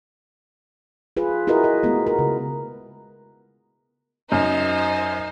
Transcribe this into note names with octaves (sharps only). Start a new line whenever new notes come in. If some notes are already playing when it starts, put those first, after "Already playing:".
F4 G#4 B4
E4 F#4 G#4 A#4 B4 D#5
D#5
G#3 A3 B3
A#4
C#3
F#2 D#4 C5